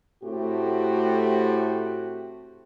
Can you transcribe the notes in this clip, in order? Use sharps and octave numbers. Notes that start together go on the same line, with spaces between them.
A2 A3 C4 F#4 G4